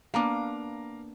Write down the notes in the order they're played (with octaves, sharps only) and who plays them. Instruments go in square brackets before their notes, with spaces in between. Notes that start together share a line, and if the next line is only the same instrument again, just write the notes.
[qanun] A#3 B3 D4 [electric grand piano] F5 A#5 D6